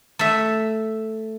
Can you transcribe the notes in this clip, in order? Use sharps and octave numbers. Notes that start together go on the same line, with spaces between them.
A3 E5